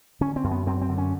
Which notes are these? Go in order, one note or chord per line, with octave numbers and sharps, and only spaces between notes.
D3 C#4
C4
F#2
B3
F#2 C4
C4
D3
C#4